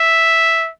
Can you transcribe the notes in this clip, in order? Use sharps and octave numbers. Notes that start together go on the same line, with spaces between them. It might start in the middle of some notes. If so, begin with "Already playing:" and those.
Already playing: E5